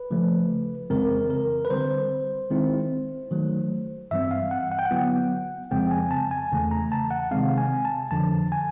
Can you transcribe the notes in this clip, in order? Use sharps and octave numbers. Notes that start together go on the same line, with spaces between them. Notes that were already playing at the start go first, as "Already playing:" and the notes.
Already playing: B4
C#3 F3 A3
F2 C#3 E3 G#3 C4 A#4
A#4
B4
D3 G3 C4 C5
D#3 G#3 C4 E4
D#3 F#3 A3
G2 E3 G3 C4 E5
F5
F#5
F#5
G5
F#5
D3 F#3 B3 E4
F2 C#3 F3 G#3 C4 G5
G#5
A5
G#5
E2 C#3 E3 A3
A#5
A5
F#5
C3 D#3 G#3 C4 F5
G#5
A5
F2 D3 F3 A5
G#5